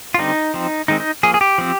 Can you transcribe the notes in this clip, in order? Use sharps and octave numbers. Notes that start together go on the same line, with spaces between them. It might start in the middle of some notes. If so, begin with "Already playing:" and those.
F4
D3 G3 C4 D#4
F3 C4
D#3 G#3 C4 D#4
D#4
F3 A#3 G#4
G#4
G4
F3 C4